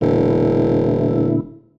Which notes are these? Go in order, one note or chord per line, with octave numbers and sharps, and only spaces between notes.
E1 A#2 D3 E4